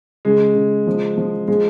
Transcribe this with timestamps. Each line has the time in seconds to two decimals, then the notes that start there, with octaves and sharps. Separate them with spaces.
0.25 C#3 G#3
0.55 C#3
0.87 F3
1.18 F3
1.48 F3 G#3